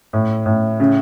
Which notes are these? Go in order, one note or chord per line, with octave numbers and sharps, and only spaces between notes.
A2
A2
C#3